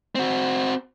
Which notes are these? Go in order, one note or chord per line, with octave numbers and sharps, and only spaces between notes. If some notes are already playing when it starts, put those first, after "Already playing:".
C4 F#4